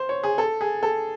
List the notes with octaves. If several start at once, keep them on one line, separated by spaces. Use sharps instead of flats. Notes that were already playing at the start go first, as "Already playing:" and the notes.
Already playing: C5
C#5
G#4
A4
G#4
A4